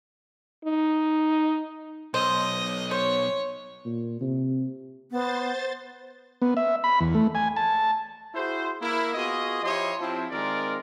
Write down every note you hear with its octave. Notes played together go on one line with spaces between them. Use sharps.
D#4
B1 C5 D#5
C5 C#5
A#2
C3
B3 C5 A6
B3
E5
B5
E2
A3
G#5
A5
E4 F#4 G#4 C5
A#3 E4
B3 F4 F#4 G#4 D#5
F3 E4 G4 C#5 D#5 C6
F3 C4 E4
D#3 G#3 C4 F4 A#4 D5